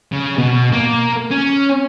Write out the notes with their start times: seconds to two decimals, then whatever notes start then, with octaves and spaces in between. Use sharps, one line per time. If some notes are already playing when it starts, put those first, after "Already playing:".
0.12 C#3
0.38 B2
0.73 A#3
1.31 C#4